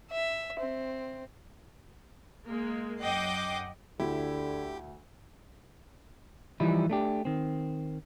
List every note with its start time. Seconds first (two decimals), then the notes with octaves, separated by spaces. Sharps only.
0.11 E5
0.60 C4
2.44 G#3 A#3
3.02 F#2 D#5 F#5 G5 D6 C7
4.00 D2 D3 E4 G4
6.60 E3 F3 G3 D#4 E4
6.90 A3 D4 G4
7.25 D#3 C4